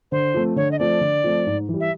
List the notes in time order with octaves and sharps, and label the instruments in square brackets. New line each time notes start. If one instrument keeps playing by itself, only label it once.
[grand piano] D3 [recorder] C5
[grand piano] F3 A3 C4
[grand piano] D3 [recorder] C#5
[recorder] D#5
[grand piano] F3 A3 C4 [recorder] D5
[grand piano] D3
F3 A3 C4
G#2
E3
G3
[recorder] E5